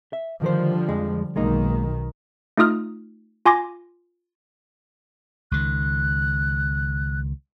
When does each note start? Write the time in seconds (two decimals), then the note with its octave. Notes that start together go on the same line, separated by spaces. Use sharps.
0.13 E5
0.42 D3 D#3 F3 G3 A#4 C5
0.89 F2 G#3
1.36 B1 D#3 G#3 A#3 D#4
2.57 A3 D#4 F4 D#6 F6
3.45 F4 G#5 C6 D6 A#6
5.52 C#2 D#3 F#6